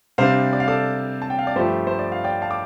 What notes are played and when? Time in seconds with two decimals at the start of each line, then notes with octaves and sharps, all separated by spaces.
0.18 C3 G3 D4 C5 F5
0.53 D5
0.60 F5
0.68 A4 D5
1.22 A5
1.30 G5
1.39 F5
1.47 D5
1.56 G2 F3 A3 G4 C5
1.87 C5
1.99 D5
2.12 F5
2.24 D5 G5
2.42 F5 A5
2.51 D6